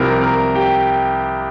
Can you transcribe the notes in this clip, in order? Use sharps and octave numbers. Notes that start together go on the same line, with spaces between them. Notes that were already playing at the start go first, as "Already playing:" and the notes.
Already playing: C2 C3 F3 A#4 A#5
A#4 A#5
G4 G5